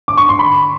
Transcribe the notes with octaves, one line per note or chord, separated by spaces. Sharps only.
D6
C#6
C6
D3 B5